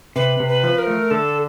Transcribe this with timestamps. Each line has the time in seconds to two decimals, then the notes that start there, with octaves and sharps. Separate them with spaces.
0.16 C3 B4
0.40 C3
0.48 B4
0.63 F3
0.79 A#4
0.87 A3
1.11 D3 A4